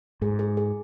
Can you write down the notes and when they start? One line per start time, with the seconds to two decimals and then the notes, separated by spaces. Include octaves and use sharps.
0.22 G#2 G#4
0.39 G#4
0.57 G#4